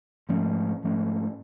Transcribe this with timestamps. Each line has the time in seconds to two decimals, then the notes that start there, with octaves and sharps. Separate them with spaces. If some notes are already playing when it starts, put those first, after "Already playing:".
0.29 G#2 F3 A3 C#4
0.83 G#2 F3 A3 C#4